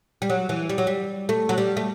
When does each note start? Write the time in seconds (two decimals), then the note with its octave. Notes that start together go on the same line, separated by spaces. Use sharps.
0.22 G3
0.30 F#3
0.49 E3
0.69 G3
0.78 F#3
0.87 G3
1.29 A3
1.49 F#3
1.58 G3
1.77 A3